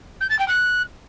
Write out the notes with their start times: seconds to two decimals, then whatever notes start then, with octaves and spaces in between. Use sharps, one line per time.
0.20 G6
0.29 A6
0.39 G5
0.48 F#6